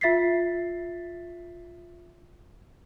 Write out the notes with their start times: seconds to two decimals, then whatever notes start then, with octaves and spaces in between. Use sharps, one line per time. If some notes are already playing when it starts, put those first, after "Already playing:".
0.01 F4 E5 A6 B6 C7